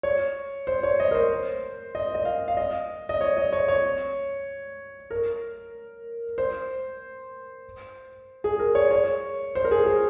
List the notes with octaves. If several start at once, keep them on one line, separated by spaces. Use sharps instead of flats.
C#5
C5
C#5
D#5
A#4
C5
D#5
D#5
F5
F5
D#5
D#5
C#5
D#5
C#5
C#5
A#4
C5
G#4
A#4
C#5
C#5
C5
A#4
G#4
G#4